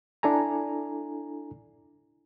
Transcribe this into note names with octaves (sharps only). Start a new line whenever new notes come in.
D4 E4 A4 G#5 A#5